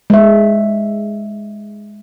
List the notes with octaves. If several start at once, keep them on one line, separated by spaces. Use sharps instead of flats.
G#3 E5